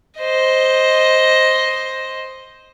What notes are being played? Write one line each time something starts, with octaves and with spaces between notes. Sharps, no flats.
C5 D#5